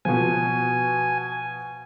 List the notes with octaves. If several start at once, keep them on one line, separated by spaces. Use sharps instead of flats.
B2 F3 G#5